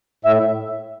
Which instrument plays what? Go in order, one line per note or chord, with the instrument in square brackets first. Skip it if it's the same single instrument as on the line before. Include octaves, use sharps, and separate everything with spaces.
[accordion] A2 E5